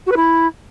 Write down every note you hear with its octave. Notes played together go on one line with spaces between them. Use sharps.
F#4
B4
E4